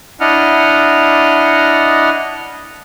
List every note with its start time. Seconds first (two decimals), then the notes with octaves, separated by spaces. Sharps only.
0.20 D4 E4 D#5 F#5 F6